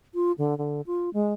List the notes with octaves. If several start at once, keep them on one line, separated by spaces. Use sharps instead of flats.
F4
D3
D3
F4
G#3